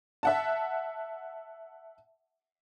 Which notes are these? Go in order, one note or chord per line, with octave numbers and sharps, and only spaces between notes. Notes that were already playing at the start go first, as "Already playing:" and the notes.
E5 F#5 A5